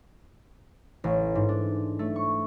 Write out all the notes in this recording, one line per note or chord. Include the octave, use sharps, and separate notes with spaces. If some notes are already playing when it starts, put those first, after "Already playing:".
A1
G#2
D4
A3
C#6